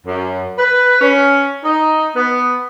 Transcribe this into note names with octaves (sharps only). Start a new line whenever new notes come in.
F#2
B4
C#4
D#4
B3